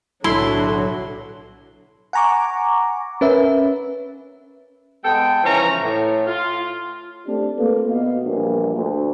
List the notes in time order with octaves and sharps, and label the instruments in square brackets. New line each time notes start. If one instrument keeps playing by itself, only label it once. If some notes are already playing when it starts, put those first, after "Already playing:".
[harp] B1 A2 [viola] D3 F#3 [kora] E4 [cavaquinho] C6
[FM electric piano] F#5 G#5 A#5 C#6 D6
C#4 A#4 B4 E5
[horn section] G#3 B3 A4 G5
G#2 C#3 E3 F3 C#4 A#5
A2
F4
[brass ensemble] A3 C4 D4 G4
A3 A#3 F4 A4 B4
B2 B3 D#5 F5
A#1 E2 G2
D2